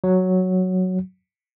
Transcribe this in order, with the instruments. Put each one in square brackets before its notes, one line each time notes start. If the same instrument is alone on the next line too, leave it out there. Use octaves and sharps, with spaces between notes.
[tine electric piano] F#3